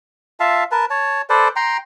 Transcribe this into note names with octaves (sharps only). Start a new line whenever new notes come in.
F4 E5 F5 A5
A#4 B4 A5
C#5 A5
A4 B4 C5 D5
G5 A#5 C6